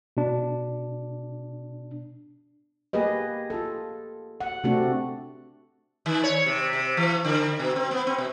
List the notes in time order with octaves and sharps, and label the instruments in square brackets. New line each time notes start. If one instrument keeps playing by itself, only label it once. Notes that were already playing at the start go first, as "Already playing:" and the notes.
[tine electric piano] B2 D4
[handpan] A#3 G4 G#4 B4 D#5
F4 A4
F#5
C3 A3 C4 D4 F#4 A4
[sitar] D#3
C#5
C3
C3
E3
D3
B2
C4
B3
C4
B2